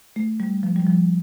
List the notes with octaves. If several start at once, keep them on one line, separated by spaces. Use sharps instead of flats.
A3
G3
F3
G3
F3